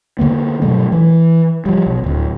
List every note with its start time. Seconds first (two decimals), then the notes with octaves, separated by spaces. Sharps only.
0.19 D3 E3 A#3 B3
0.62 G2 B2 F#3 A3
0.92 E3
1.66 F3 G3
1.86 B1
2.04 D1 D2